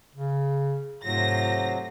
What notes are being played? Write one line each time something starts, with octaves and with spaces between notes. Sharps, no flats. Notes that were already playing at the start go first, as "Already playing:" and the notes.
C#3
G#2 C3 F#3 A3 F4 C5 A#6